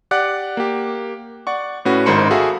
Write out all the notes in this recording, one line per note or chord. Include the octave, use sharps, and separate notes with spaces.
G4 D5 F#5 F#6
A#3 G4
D5 F#5 C#6
A2 C#4 F#4 B4
G#1 G#2 A#4 C5 B5 C#7
F#4 G#4 A4 E5 F5